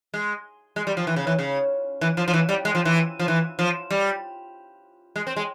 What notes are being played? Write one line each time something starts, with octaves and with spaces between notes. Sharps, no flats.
G#3
G#3
G3
F3
E3
C#3
E3
C#3
E3
F3
F3
E3
G3
G#3
F3
E3
F3
E3
F3
G3
G#3
C4
G#3